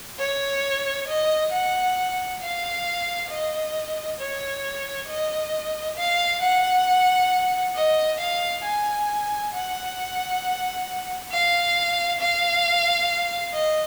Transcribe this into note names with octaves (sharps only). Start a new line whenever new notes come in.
C#5
D#5
F#5
F5
D#5
C#5
D#5
F5
F#5
D#5
F5
G#5
F#5
F5
F5
D#5